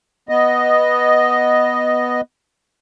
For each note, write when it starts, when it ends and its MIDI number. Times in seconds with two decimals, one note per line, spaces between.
0.29 2.21 59
0.29 2.21 75